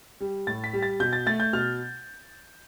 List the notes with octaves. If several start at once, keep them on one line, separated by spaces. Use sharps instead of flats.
G3
A2 A6
B6
G3
A6
B2 G6
A6
A3 A6
G6
B2 F6